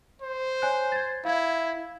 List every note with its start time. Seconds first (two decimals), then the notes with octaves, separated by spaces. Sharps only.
0.22 C5
0.62 C#5 G#5 F#6
0.92 G#6 A6
1.25 E4 F5 G#6